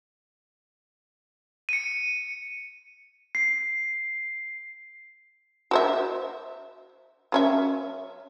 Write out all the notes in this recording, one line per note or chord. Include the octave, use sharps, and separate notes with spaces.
C#7 D#7
C7
F#4 C5 E5
F#3 C#4 E5